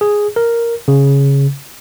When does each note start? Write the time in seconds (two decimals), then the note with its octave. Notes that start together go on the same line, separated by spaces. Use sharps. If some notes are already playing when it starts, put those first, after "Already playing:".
0.01 G#4
0.36 A#4
0.88 C#3